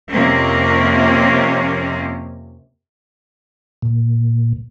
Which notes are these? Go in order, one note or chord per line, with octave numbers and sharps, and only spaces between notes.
F2 C3 A#3 C4 C#4
A#2